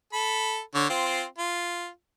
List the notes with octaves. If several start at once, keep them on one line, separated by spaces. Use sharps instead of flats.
A4 B5
D3 C#5
C4 F4
F4